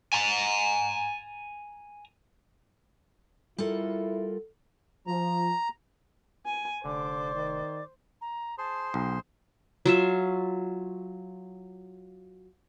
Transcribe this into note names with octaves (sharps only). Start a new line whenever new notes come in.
G#5 A#5
G3 E4 F4 A4 A#4 F#5
F3 A#5
G#5
F1 D3 C5 D5 D6
D#3
A#5
G#4 C5 A5 C6
B1 G5
F#3 F4 E5